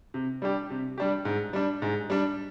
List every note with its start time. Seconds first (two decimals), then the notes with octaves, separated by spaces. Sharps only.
0.14 C3
0.42 G3 D4 G4
0.70 C3
0.98 G3 D4 G4
1.25 G#2
1.53 G3 D4
1.82 G#2
2.10 G3 D4